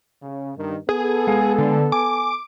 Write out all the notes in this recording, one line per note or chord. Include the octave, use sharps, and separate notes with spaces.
C#3
G2 D#3
B3 G#4 A4
G#3 F5 G#5
D3
G#5 D6